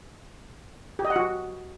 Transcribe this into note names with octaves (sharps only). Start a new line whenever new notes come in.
G4
D#5
F#5
F#4